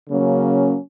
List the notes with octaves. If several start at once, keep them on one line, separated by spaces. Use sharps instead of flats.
C#3 F#3 A#3 C#4